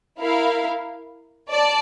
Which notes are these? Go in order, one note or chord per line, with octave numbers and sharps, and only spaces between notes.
E4 A#4 F5
D5 A5